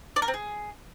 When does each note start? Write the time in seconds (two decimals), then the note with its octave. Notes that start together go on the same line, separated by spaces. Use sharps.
0.16 D5
0.22 A#4
0.28 C4
0.34 G#4